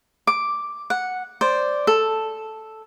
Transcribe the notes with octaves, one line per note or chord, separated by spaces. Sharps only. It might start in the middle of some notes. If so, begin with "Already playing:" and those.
D6
F#5
C5 D5
A4